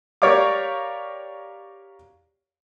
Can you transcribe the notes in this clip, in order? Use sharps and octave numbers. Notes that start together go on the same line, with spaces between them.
G4 A#4 C#5 D5 F5 D6